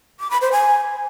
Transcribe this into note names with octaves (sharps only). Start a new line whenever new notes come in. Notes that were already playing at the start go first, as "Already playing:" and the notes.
D6
B5
C5
G#5